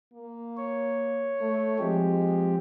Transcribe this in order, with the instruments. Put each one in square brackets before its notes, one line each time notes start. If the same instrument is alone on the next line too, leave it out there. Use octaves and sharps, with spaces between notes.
[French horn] A#3
[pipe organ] C#5
[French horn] A3
[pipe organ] F3 C4 G4 [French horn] G#3